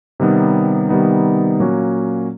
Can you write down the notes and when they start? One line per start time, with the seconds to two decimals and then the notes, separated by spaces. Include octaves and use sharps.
0.20 C3 D#3 G3 B3 D#4
0.89 C3 D#3 G3 B3 D#4
1.59 A#2 F#3 A#3 C#4 F#4